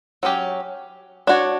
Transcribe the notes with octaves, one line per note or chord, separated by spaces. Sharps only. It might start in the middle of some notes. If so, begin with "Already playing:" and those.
F#3 C#4 G4
D4 F#4 C#5